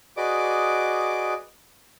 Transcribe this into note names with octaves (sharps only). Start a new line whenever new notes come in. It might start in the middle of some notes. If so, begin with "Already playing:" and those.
F#4 G#4 B4 D5 D#5 D6